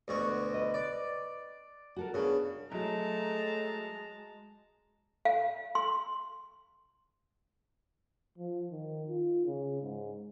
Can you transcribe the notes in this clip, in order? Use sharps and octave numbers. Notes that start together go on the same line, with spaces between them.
D2 B2 F#4
B4 D#5
D5
F#4 A4 A#4
C#3 B3 D4
F#3 G#3 A3 A5 A#5
F5
C6
F3
D#3
F4
C#3
G#2